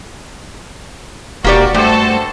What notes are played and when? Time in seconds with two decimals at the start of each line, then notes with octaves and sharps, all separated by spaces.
1.44 E1 A#3 F#4 G4 D5
1.74 G2 A3 F#4 A4 C5